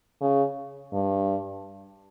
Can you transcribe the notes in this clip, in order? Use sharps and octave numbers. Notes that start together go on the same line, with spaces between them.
C#3
G2